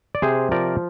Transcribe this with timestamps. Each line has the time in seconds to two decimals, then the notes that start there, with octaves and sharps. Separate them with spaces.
0.15 D5
0.22 C3 G#4 C5
0.51 F3 A#4 D5